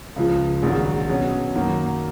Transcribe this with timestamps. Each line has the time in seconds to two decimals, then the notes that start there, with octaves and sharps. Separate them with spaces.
0.16 C#2 C#3 F3
0.62 A#1 G#2 D#3 F#3
1.09 B2 F#3 C#4
1.55 F#2 D#3 F#3 A#3